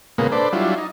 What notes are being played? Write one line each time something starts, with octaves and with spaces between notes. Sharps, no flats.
A#2 C#3 G#3 A#3 B3
D4 A4 B4 C5 D5
F#3 G3 D4 E4 F4
D#4